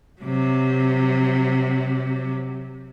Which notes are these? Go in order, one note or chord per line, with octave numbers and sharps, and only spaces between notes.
C3 F#3